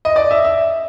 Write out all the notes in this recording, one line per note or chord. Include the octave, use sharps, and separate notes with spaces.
D#5
D5
E5
E5